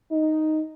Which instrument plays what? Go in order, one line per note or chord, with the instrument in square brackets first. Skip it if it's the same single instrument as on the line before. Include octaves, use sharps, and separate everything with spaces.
[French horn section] D#4